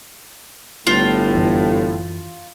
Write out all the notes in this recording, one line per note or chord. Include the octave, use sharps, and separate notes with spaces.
G1 A2 F4
F#2 E3